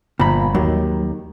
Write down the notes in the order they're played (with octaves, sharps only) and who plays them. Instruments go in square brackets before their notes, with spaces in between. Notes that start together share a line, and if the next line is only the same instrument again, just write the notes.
[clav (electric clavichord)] G1 F3 A#5 [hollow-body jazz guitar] A#2 B5
[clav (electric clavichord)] D#2 D#3 [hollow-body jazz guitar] F#3